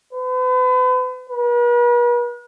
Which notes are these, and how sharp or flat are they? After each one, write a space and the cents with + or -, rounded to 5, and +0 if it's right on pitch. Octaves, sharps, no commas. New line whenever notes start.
B4 +40
B4 -45